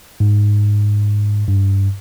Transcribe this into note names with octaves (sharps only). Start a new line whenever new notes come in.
G#2
G2